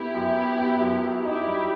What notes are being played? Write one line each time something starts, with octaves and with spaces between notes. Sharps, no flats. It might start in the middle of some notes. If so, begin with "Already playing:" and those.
Already playing: B3 E4 G4
F#2
B3
B3
F#2
F#3
D#4 E4 G4
G3